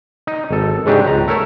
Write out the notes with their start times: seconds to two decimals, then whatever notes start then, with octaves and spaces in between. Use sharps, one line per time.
0.27 D#4
0.51 G#1 A4
0.86 G#2 C#3 D4 D#4 G4
1.07 C#2 A#5
1.28 A3 A#4 C#5 E5